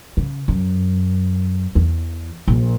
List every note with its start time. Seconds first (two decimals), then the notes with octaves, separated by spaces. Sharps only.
0.17 C#3
0.48 F#2
1.75 E2
2.48 A#1